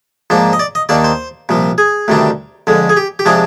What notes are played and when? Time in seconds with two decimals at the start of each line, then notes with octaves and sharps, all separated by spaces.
0.30 G#2 F3 A#3 D4
0.53 D#5
0.59 D5
0.75 D#5
0.89 D#2 D#3 A#3 D4 D5
1.04 C5
1.49 C2 A#2 F3
1.78 G#4
2.08 D2 C3 D#3 G3 D4
2.67 F2 D3 G#3
2.89 G#4
2.97 G4
3.19 G4
3.25 C3 F3 G#3 D4 G#4